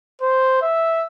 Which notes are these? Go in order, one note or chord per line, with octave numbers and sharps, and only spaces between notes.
C5
E5